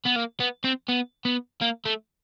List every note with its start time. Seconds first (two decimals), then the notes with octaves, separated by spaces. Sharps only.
0.05 B3
0.16 A#3
0.40 B3
0.65 C4
0.89 B3
1.25 B3
1.61 A#3
1.85 A3